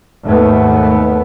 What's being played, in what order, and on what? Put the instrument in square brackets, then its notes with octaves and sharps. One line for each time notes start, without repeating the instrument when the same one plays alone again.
[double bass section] D#2 G#2 A3 B3